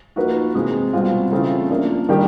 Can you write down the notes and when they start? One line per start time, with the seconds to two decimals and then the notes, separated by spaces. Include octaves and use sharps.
0.16 F3 A#3 D#4 F#4 B4
0.55 C3 E3 G#3
0.93 B2 G3 C4 F4
1.32 C#3 E3 A3 C4 F4
1.70 F3 A#3 D4
2.09 D#3 G3 A#3 D4 G4